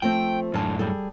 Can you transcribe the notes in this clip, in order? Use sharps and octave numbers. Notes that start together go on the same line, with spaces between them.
F3 A3 C4 G5
F#2 A2 D3 A5
G3 G#4 A4